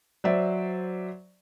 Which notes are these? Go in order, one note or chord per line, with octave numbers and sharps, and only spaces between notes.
F#3 C5 D5 E5